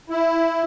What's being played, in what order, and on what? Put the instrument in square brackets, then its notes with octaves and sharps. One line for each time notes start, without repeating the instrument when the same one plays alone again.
[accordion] E4